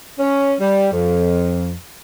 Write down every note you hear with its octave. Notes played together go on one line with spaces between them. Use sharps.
C#4
G3
F2